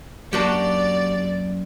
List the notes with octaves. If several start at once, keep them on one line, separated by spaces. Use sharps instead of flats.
F#2 A#3 D4 F#4 G4 D5 A5